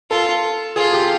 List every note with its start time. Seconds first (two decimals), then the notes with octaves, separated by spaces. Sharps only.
0.11 F4 A4
0.76 F4 G#4
0.93 G4